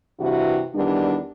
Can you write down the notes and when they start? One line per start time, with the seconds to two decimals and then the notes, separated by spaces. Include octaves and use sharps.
0.18 G2 C3 E3 F#4
0.74 E2 D#3 G3 D4